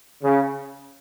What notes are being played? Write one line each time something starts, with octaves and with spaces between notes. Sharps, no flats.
C#3